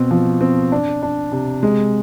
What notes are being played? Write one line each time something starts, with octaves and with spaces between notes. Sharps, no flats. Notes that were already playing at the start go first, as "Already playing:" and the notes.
Already playing: B2 C4
F3
C4
D4
D4
C3
G#3